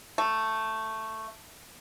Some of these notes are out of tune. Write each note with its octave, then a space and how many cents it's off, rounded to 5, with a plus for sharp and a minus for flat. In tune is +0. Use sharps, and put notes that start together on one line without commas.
A3 +5